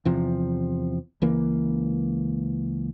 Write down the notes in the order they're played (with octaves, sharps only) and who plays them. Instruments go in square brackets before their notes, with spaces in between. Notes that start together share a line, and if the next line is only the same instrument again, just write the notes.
[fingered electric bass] E2 C3 F3
C#2 E3 A#3